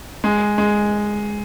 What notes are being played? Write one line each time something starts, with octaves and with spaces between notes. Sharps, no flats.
G#3
G#3